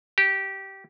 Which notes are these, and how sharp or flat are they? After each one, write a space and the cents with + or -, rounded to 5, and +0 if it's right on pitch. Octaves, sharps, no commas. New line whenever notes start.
G4 -15